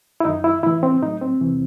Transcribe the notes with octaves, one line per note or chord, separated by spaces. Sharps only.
E4
F#2 D#3 F#3 D#4
E4
A2 E3 E4
C4
A2 F#3 D#4
C4
E2 C3 E3